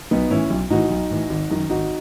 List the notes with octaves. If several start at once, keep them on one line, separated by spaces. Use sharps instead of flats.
B1 B3 D#4
A2 E3 C#4 E4
B1
A2 E3 D#4 F#4
B1
A2 E3
G#1
F#2 D#3
G#1 D#4 F#4